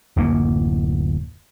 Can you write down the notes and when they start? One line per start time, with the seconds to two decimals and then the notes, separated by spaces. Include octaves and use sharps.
0.16 D1 F#2 A#3